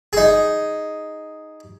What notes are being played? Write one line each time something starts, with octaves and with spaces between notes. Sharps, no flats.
D#4 G#4